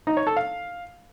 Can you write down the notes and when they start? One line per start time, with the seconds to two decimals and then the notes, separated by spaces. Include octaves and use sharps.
0.07 D#4
0.17 C#5
0.27 A4
0.37 F5